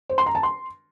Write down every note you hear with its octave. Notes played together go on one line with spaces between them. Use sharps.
C5
C6
A#5
A5
C6